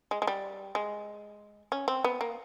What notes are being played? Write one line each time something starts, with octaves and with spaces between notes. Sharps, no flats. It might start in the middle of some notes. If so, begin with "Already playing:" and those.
G#3
G#3
G3
G#3
C#4
C4
B3
A#3